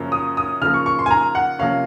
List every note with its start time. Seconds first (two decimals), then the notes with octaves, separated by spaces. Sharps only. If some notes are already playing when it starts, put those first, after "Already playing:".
Already playing: F#2 C#3 F3 A#3 C#4
0.12 D#6
0.37 D#6
0.62 C#3 F3 A#3 F6
0.74 C#6
0.86 C#6
0.99 C6
1.06 G#5
1.11 A#5
1.35 F#5
1.59 C3 F3 A#3 C#4 F5